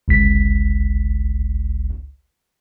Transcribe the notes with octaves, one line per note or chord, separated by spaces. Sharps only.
G1 C#2 B6